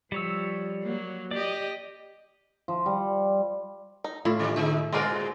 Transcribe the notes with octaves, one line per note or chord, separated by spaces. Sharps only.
F3 G3 C#5 E6
F#3 A#3
G4 D5 D#5
F3
G3
D#4
A2 E4 F4
D#3 G3 D4
D3 G#3 D#4 E5
A2 G#3 C4 F4 F#4 G#4 A#4 D5